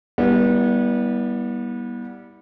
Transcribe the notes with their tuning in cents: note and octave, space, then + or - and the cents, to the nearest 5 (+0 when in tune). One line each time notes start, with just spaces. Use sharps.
G3 +0 B3 -30 E4 -35